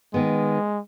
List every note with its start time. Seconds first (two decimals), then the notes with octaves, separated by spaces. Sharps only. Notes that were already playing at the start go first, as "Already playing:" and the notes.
0.14 D#3 G#3 B3